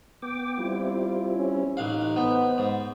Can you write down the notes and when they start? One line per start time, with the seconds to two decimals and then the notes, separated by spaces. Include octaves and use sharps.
0.22 B3 G5 D6
0.59 G3 C4 E4 F4
1.35 C#4
1.77 A1 D#4 F5 F#6
2.16 B3 C5
2.58 G#2